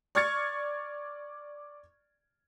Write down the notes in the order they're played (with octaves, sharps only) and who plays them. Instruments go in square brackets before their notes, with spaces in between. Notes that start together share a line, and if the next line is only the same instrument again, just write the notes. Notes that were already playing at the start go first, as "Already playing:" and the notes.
[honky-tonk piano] D5 C#6 F6 G#6 A6 C#7